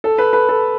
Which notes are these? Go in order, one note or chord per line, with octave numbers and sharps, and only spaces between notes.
A4
B4
B4
A4